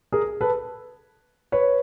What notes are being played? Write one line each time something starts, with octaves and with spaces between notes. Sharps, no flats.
G#4 A#4
A4 B4
B4 C#5